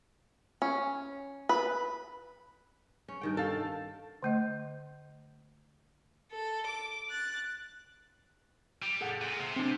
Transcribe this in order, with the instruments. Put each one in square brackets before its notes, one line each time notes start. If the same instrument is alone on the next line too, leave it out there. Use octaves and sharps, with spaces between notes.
[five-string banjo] C#4
B4
[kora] C#4
G2 D#3 G5
[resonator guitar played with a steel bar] A4 F5
[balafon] D3 A3 D#5
[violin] A4
D6
F#6 A6
[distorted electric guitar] G3
[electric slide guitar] G#4 A4 F#5
[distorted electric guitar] A#2
C3
[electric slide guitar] C4 D4